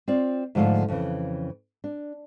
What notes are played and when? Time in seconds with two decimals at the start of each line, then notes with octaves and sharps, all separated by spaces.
0.08 C4 F4 D5
0.55 G#2 D3 F3 A3 F5
0.88 F2 C#3 E3
1.84 D4